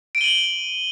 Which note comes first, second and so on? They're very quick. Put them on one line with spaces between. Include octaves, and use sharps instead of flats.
D7 D#7 G7 F#7